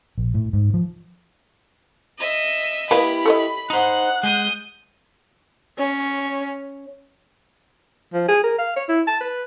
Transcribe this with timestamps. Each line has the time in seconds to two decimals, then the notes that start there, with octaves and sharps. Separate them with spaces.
0.18 A#1
0.34 A2
0.53 G#2
0.74 F3
2.18 D#5 E5
2.91 A#3 E4 G4 B4 D#5 B5
3.26 A4 C#5 D#5
3.70 D#4 C5 F#5 F#6
4.23 G#3 D#6 G6
5.78 C#4
8.13 F3
8.28 G#4
8.43 A#4
8.58 F5
8.76 C#5
8.88 E4
9.07 A5
9.20 B4